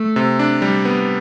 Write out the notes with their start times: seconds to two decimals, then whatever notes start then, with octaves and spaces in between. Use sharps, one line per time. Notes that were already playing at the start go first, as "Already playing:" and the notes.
Already playing: A3
0.16 C3
0.39 D4
0.62 G3
0.85 B3